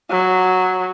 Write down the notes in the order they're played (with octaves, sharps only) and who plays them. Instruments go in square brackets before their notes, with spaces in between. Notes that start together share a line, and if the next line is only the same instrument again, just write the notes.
[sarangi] F#3